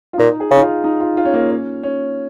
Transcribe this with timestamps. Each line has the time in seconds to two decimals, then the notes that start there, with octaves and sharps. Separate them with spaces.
0.13 F4
0.18 A#2 D#4
0.40 G#4
0.51 C#3
0.57 D#4
0.62 F4
0.84 D#4
1.00 F4
1.17 F4
1.25 C#4
1.34 A#3
1.50 C#4
1.83 C#4